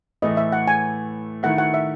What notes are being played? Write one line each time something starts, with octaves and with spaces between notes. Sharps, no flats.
A2 E3 A3 D#5
E5
F#5
G#5
D#3 A3 E4 F#5
F#5
E5